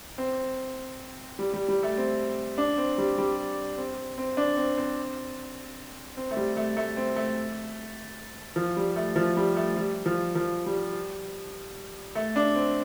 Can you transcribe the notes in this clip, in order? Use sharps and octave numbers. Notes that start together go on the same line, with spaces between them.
C4
G3
G3
G3
A3
C4
D4
C4
G3
G3
C4
C4
D4
C4
C4
C4
A3
G3
A3
A3
C4
A3
F3
G3
A3
F3
G3
A3
G3
F3
F3
G3
A3
D4
C4